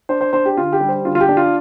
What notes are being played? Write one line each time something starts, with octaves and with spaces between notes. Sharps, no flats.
D4 C5
C5
D4 C5
G4
D3 F4
G4
G3
C5
D3 F4
F4
G4
D4
F4